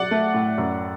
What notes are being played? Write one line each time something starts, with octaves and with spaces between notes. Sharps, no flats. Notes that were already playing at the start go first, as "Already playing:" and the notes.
Already playing: F#3 D5 F#5
A3
A2
F#2